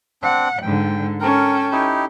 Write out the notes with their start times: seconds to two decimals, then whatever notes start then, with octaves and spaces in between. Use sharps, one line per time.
0.22 C4 D4 F#5
0.62 G#2 D3 G5
1.20 C#4 A4 A#4 G5
1.72 D#4 E4 G4